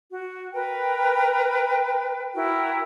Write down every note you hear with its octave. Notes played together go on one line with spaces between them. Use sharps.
F#4
A#4 B4 G5
E4 F#4 A#4 G5